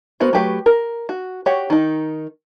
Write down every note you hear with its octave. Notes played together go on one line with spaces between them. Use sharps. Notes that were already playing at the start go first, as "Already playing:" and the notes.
B3 F#4 A#4 C5
F#3 A3 G4 B4
A#4
F#4
F#4 G4 C#5 F#5
D#3 D#4